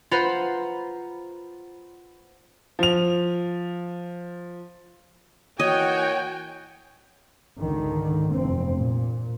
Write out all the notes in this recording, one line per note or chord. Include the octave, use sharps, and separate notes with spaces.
F4 B4 C5 F#5 A#5 B5
F3 F7
E3 A#3 F#4 C#5 D#5 G5 G#5
G#1 C#2 D3 D#3
F1 E2 G2 C4
A#2